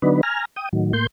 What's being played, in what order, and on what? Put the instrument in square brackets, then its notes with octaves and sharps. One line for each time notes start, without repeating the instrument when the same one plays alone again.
[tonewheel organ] D3 F#3 B3 D4 D#4 B4
G#5 A#5 F6
G5 D#6
A2 D#3 F#3
A2 A#3 C6 G6